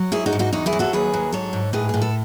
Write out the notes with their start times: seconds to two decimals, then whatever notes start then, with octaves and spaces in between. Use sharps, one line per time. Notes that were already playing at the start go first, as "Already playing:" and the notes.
Already playing: F#3
0.12 G#2 E4 G#4
0.26 D#4 F#4
0.33 G#2
0.39 D#4 F#4
0.53 E2 D#4 F#4
0.66 E4 G#4
0.73 F#3
0.79 F#4 A4
0.93 D#2 G#4 B4
1.14 F#3
1.32 G#2 A4 C#5
1.53 G#2
1.73 A2 G#4 B4
1.89 A2 G#4
2.02 A4